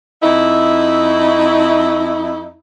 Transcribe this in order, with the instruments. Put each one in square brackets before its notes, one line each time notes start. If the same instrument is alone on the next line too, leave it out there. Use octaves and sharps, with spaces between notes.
[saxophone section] F2 D#4 E4